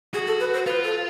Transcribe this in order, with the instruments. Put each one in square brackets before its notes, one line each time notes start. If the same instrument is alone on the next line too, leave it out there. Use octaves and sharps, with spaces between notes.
[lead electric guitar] F#4 [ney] G#4
[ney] A4
B4
C5
[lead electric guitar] F4 [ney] B4
[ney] A4